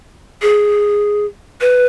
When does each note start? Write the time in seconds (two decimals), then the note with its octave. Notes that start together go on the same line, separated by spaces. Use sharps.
0.42 G#4
1.61 B4